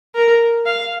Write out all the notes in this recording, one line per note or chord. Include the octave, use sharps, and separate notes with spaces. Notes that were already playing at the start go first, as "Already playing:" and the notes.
A#4
F5